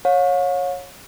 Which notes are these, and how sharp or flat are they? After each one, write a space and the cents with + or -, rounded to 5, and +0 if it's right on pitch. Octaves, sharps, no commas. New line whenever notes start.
C#5 -10 F5 +45